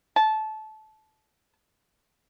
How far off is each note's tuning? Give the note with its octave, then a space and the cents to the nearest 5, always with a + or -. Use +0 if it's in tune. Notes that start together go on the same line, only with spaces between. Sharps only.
A5 -20